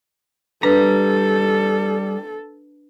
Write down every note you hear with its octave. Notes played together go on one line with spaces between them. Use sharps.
G3 D4 A4 B4 A#5